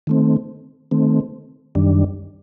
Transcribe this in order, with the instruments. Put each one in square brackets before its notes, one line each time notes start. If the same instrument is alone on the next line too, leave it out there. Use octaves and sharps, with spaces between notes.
[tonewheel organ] D#3 A3 C4
D#3 A3 C4
F#2 D#3 G3 D4